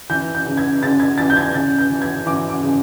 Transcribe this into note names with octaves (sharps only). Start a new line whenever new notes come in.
E3 G6
G6
C#3
G#6
C#3 A6
G#6
E3 A6
G6
G#6
C#3 A6
G6
E3
G#6
E3 D6
D6
C#3